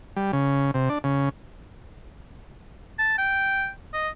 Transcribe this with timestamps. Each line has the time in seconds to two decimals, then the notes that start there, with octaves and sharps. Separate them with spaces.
0.16 G3
0.33 C#3
0.74 C3
0.89 D4
1.04 C#3
2.99 A5
3.18 G5
3.94 D#5